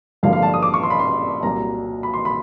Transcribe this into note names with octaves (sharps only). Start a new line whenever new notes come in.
G#1 G2 D3 F3 A#3 F5
F5
A5
D#6
D6
C#6
C6
B5
C6
C2 A#2 F#3 A#5
B5
C6
B5